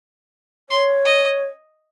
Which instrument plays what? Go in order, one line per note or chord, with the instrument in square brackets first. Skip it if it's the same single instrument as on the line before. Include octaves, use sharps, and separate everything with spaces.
[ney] C#5 [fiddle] C6
[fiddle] D#5